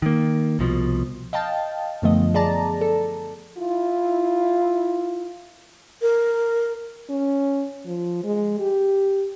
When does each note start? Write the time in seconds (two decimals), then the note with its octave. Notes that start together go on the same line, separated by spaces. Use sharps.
0.02 D#3 A#3
0.59 C2 B2 F3
1.33 D#5 F5 G5 A5
2.02 F#2 D3 F3 A3 B3 D#5
2.34 G#4 D5 A5 A#5
2.81 A4
3.57 E4 F4
6.02 A#4
7.10 C#4
7.86 F3
8.24 G#3
8.60 G4